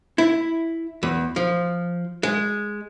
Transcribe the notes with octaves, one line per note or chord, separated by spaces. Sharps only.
E4
E2
F3
G#3